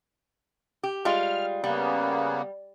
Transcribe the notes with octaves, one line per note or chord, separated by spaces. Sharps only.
G4
G3 G#3 F4 F6
C#3 G3 A#3 B3